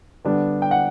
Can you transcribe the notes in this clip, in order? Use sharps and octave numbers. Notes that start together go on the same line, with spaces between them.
D3 G3 B3 D4
G5
F#5